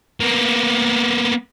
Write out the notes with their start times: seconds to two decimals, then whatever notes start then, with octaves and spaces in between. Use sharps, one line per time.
0.20 A#3 B3